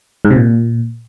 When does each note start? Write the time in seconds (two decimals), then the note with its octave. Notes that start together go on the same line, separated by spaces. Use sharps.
0.25 G#2
0.30 C3
0.36 A#2